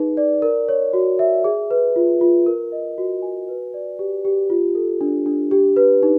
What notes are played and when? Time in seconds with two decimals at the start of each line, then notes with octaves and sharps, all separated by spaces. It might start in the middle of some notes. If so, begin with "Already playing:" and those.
Already playing: D#4 G#4 B4
0.17 D5
0.42 A#4
0.69 C#5
0.93 F#4
1.19 E5
1.44 G#4
1.71 B4
1.96 F4
2.21 F4
2.46 A#4
2.72 D#5
2.98 F#4
3.22 G#5
3.48 B4
3.74 D5
3.99 G4
4.25 G4
4.50 F4
4.75 A4
5.01 D4
5.26 D4
5.51 G4
5.76 B4
6.03 D#4